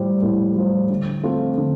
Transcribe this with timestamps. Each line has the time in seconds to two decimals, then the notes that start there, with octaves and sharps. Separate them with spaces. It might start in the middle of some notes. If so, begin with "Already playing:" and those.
Already playing: A2 G3 F4 C5
0.23 A2
0.56 G3 F4 C5
0.90 D3
1.23 A3 C4 F4
1.58 D3